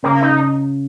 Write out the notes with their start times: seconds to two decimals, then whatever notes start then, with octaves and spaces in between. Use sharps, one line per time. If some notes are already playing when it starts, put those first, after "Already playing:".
0.03 C#3 A#3
0.23 D#4
0.29 C#3